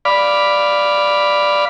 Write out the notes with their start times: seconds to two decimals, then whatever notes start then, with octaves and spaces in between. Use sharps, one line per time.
0.05 D5 F5 B5